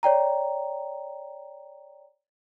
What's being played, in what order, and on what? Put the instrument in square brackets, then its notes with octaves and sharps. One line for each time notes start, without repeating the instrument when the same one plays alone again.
[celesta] C#5 D5 G5 A#5